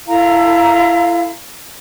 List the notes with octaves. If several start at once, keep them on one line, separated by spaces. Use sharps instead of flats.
E4 A4 F5 A#5